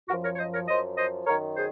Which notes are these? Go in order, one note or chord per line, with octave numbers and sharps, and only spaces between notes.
F#2 F3 F#4 A#4
A#4 C#5
C#5
C5 D#5
A#4 C#5
F#2 F3 C5 D#5
C5 D#5
F#2 D#3 A#4 C#5
G#4 C5